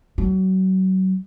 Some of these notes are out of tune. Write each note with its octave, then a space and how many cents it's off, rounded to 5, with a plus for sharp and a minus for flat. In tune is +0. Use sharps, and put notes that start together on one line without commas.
F#3 +30